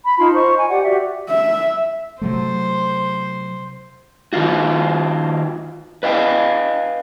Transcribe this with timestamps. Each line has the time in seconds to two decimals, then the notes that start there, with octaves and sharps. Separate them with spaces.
0.04 B5
0.19 D#4 F4 A5 C6
0.34 C5 D#5 C#6
0.57 G#5
0.69 G4 D5 F#5
0.84 F#4 G4 D5 E5
1.29 E5
2.22 C3 F#3 A3 C5
4.33 D#3 D#4 F4 F#4
6.03 B4 D#5 F5 G5